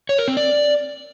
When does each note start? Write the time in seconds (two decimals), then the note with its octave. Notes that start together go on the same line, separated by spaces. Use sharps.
0.09 C#5
0.18 A#4
0.28 C4
0.37 D5